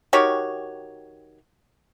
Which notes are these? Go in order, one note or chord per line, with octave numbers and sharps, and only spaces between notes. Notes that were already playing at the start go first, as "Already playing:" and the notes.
D#3 F#4 G4 C#5